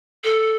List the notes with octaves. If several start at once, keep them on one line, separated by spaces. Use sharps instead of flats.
A4